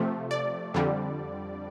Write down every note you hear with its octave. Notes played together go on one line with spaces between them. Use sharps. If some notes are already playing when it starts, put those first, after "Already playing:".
Already playing: C3 F3 A3
D5
F2 D3 G3